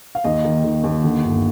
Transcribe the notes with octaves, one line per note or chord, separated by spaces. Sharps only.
F5
D#2 D#5
D#3
D#3
D#2
D3
G1